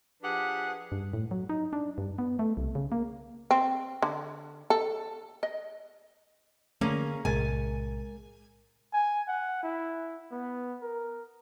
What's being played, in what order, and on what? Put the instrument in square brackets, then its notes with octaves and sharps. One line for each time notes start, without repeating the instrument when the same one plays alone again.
[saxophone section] F3 D4 G4 G#4 B4 F#5
[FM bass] G2
A2
F#3
D#4
D4
G2
B3
A3
C2
C#3
A#3
[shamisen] C4
D3
A4
D#5
[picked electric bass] D3 E3 A3 [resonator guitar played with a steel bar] A#3 C#4 G#4
[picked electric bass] B1 A2 C3 [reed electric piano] G#3 A#4 A6 [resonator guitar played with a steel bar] G#5
[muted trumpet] G#5
F#5
E4
B3
A#4